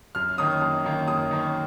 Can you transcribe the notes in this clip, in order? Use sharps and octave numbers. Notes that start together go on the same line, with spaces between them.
F#2 F6
D#3 A#3 C#4 D#6
F#2
D#3 A#3 C#4
F#2 D#6
D#3 A#3 C#4